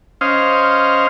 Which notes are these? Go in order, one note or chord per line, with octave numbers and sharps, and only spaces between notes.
C#4 C5 D#5 F5